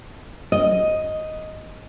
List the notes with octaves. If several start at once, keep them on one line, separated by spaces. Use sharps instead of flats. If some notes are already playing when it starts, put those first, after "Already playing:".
D#5